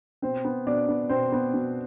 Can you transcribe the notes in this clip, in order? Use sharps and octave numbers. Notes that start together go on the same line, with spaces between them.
B2 C4 C5
B3
B2 D4 D5
B3
B2 C4 C5
B3
B2